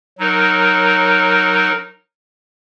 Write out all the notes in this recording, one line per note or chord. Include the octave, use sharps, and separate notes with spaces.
F#3 D#4 A#4